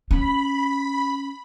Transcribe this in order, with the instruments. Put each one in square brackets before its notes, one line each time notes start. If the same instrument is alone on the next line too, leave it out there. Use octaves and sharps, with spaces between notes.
[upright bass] C#4 [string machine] B5